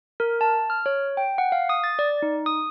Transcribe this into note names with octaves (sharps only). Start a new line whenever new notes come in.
A#4
A5
F6
C#5
G5
F#5
F5
D#6
A6
D5
D#4
D#6